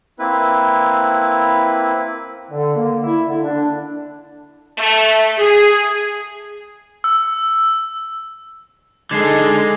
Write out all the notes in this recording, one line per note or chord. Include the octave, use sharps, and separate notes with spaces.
A#3 C4 E4 B4
D3
A#3
E4
D3
D4
A3
G#4
E6
D3 G#3 D#4 A4 G#6 C7